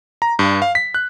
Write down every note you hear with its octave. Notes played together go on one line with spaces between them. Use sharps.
A#5
G2
F5
B6
F#6